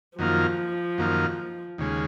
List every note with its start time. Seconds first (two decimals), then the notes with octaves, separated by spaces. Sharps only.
0.18 F#2 D#3 F3 A#3 F4
0.98 F#2 D#3 A#3 F4
1.78 D#2 C#3 G#3